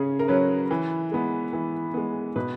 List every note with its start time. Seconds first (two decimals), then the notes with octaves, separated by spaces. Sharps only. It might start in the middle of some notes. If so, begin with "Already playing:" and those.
Already playing: C#3 C#4 G#4
0.19 A#4
0.28 F#3 C#4 B4
0.71 E3
1.11 G#3 B3
1.53 E3
1.94 G#3 B3
2.36 B2 B4